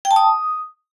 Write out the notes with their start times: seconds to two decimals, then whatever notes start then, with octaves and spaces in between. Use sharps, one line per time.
0.05 G5
0.11 A5
0.16 D#6